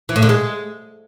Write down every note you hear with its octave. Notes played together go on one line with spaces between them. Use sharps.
E3
A2
D3
G#3